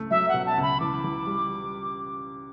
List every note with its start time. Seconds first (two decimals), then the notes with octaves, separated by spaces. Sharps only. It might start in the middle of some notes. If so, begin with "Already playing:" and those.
Already playing: C#2 A3
0.11 F#3 E5
0.29 B2 F#5
0.46 A5
0.57 C#2 B5
0.80 E3 D6
1.04 E3
1.27 G3